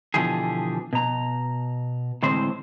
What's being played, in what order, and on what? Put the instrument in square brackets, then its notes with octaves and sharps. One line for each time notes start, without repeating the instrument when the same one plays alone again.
[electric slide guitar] B2 D3 E3 F3 G4 G#4
B2 A#5
A2 D3 E3 G#3 C4 C5